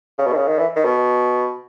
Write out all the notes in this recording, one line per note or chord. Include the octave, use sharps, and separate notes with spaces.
C#3
B2
D#3
C#3
D#3
E3
D#3
B2